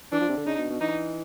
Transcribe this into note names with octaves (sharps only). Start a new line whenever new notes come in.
E3 D4
F3
C3
D3
C#3 D#4
B2
B2
E3 D#4